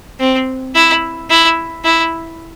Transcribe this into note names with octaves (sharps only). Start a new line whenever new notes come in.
C4
E4
E4
E4